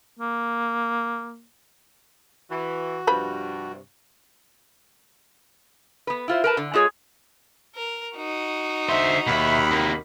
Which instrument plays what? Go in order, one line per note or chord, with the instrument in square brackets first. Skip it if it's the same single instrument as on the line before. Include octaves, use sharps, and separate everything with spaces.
[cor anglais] A#3
[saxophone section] E3 [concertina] F#4
[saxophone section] G2 C3 [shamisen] F3 B4 B5
[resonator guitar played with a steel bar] B3 B4
E4 F4 C5
A#4 B4 A5
D3
G#3 F4 G#4 C#5
[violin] A#4
D#4 F#4
[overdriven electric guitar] D3 C5 [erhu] E5
[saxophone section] D#2 [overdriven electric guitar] B2 E5 [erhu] B5
[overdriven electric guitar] C3 A#3